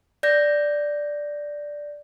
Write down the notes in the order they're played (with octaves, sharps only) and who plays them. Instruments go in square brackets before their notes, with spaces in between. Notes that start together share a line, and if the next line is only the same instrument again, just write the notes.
[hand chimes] D5 G6 A#6